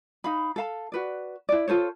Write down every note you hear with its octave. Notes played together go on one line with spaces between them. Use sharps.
D#4 F5 B5
A4 F5 A5
F#4 B4 D5
E4 D5
F4 A4 C5 C#5